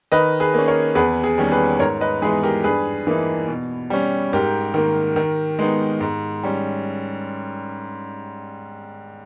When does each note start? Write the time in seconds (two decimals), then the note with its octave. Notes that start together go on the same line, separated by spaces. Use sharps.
0.12 D#3 B4 D#5
0.40 G#4 B4
0.54 A#3 C#4
0.68 A#4 C#5
0.95 E2 G#4 B4
1.24 G#4
1.38 D#3 G3 A#3 C#4
1.52 G#4 B4
1.80 G#2 A#4 C#5
2.01 B4 D#5
2.22 E3 G#3 B3 D#4 G#4 B4
2.43 G4 A#4
2.64 G2 G#4 B4
3.07 E3 A#3 D#4
3.48 B2
3.90 G3 C#4
4.33 G#2 G4 A#4
4.74 D#3 A#3
5.16 D#3
5.59 G#3 B3 D#4
6.01 G#2
6.43 G3 C#4